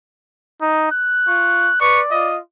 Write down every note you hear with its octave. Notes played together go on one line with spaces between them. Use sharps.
D#4
F#6
F4 C#6
B4 D5 C#6
F4 D#5